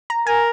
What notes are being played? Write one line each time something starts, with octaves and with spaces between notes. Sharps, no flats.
A#5
A#4 G#5